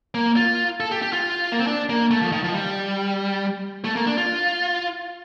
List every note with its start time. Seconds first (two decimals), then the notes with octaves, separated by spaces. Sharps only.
0.14 A#3
0.36 F4
0.80 A4
0.92 G4
1.02 G4
1.13 F4
1.52 A#3
1.59 C4
1.67 D4
1.89 A#3
2.11 A3
2.22 F3
2.32 D#3
2.44 F3
2.54 G3
3.85 A3
3.96 A#3
4.07 D4
4.17 F4